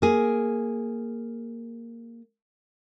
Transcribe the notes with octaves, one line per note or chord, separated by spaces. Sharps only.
A#3 G#4